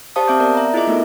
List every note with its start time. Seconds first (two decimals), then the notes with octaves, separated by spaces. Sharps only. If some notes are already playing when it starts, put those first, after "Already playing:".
0.16 G4 C5 D5 F5 A5 D#6
0.28 C4 E5 D6 G6
0.40 B3 A#4 D5
0.55 E5 A#5
0.74 E4 F4 G#4 D#5 E5 D6
0.87 A3 B3 D#4 A4 A#4